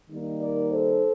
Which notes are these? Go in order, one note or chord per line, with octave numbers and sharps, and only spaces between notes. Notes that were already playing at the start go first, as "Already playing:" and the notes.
D#3 G3 A#3 D#4
A#4 D5
A4 C5